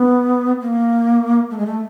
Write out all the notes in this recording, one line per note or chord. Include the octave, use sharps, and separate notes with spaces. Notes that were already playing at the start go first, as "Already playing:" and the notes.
Already playing: B3
A#3
A3
G#3
A3